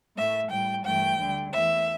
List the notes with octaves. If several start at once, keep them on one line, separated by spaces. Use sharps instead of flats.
A2 A3 E5
A2 G3 G5
G2 E3 A3 G5
D2 D3 G3
E2 E3 A3 E5